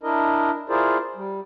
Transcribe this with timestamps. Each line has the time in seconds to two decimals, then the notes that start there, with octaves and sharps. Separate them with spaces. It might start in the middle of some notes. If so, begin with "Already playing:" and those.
0.03 D4 E4 A#4 D#5
0.69 E4 F4 G#4 A#4 C5 D5
1.16 G3